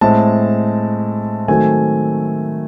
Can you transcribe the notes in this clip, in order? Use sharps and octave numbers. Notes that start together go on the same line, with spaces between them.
A2 G#3 C4 A5
D#3 F#3 A3 C4 G#5